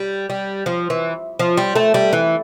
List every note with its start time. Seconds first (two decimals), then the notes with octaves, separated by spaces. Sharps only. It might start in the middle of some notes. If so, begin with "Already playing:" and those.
Already playing: G3
0.30 G3
0.66 F3
0.90 E3
1.39 F3
1.57 G3
1.75 A3
1.94 G3
2.13 E3